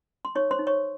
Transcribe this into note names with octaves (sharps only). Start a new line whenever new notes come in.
C6
D#4 C#5 C#6
C5 C6
D#4
C#5 C#6